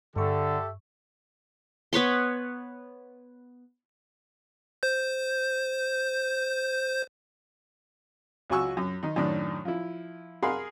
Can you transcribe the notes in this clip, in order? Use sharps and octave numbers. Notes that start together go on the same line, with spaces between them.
G2 D3 G4 A4 E5 C#6
B3 B4 C#5 C6
C5 G6
C#2 F#3 F#4 G#5 C#6 E6
F#2
D#3 D#4
F#2 A2 D#3 D4
F3 E4
G#4 A#4 F5 F#5 B5 C6